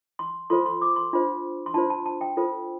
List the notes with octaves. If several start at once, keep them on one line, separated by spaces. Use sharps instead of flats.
C6
F4 A4 C5 C6
C6
D6
C6
D4 F4 C5
C6
D4 F4 C5 A5
A5
A5
G5
F4 A4 C5